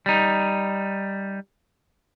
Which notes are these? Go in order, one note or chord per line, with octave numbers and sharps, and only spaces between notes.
G3 D#4